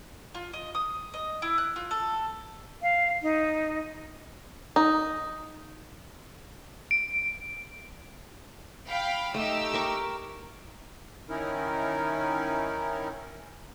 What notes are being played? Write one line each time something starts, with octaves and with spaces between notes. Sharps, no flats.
F4
D#5
D#6
D#5
E4
F#6
F4
A4
F5
D#4
D#4
D7
F5 G5 B5
A3 D#4 G4 E6
A#4 C#6 D6
D#3 C#4 D#4 E4 A#4